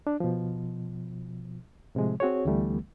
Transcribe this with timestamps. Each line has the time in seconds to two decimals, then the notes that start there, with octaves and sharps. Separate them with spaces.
0.07 D4
0.20 B2 F3
1.95 A2 C3 F3 G#3
2.20 C4 F#4 G#4 C#5
2.45 D2 D3 E3 G3 A3 B3